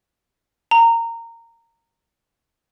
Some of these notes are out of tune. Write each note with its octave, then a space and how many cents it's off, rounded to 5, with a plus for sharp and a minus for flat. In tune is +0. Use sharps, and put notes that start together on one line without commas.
A#5 -15